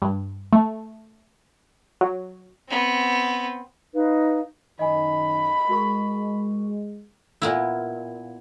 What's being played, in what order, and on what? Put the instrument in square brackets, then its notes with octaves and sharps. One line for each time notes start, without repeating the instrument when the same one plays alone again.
[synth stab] G2
A3
F#3
[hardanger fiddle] B3 C4
[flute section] D#4 B4 F5
[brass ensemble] F#2 D#3 [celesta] D#5 G#5 [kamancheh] B5
[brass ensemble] G#3 [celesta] F#4 A#4 C#6
[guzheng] A#2 B3 E4